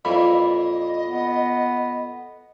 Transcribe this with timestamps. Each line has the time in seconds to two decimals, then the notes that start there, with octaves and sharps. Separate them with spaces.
0.05 F2 A#2 E3 D#5 B5
1.08 B3